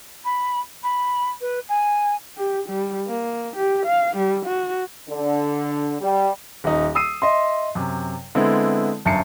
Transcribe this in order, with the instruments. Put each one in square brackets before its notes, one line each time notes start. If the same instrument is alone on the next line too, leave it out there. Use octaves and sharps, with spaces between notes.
[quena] B5
B5
B4
G#5
[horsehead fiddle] G4
G3
A#3
G4
F5
G3
F#4
[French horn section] D3
G3
[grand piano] D#1 D#4
D#6 E6 C7 D#7
D#5 E5 C6
F#2 C3
D3 G#3 B3 C4 E4
G1 F#2 E5 A5 C7 C#7